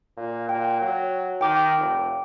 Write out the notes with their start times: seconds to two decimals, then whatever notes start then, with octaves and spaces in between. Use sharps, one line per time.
0.17 A#2
0.49 A#2 G5
0.81 F#3
1.41 D#3 G5 D6
1.79 F1